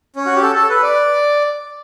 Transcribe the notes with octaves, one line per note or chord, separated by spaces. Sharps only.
C#4
F#4
G4
A4
A4
B4
D5